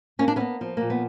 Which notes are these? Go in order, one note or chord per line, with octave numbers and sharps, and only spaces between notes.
A#3 C#4
D4
A#3 B3 C#4
F3
A#2 A#3
B3